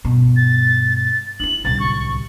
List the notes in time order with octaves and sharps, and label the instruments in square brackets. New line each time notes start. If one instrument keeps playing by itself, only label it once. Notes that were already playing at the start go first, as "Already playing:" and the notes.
[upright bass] G2 B2
[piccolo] A6
[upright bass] D4 E4 [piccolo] F#7
[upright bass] D1 C2 [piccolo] A6
[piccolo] C#6